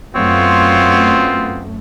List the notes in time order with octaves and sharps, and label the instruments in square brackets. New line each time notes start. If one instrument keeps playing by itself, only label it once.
[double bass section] F#2 A3 [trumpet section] B3 F4 [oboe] C4 [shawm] C#5